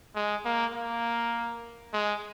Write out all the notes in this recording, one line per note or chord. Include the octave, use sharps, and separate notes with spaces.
G#3
A#3
A#3
G#3